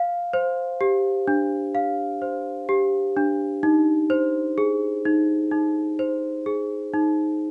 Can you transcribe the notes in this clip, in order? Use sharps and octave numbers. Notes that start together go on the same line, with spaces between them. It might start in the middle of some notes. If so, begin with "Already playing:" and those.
Already playing: F5
C5
G4
D4
F5
C5
G4
D4
D#4
C5
G#4
D#4
D#4
C5
G#4
D#4